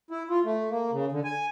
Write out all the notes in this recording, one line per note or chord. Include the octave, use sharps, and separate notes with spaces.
E4
F4
A3
A#3
C#3
D3
G#5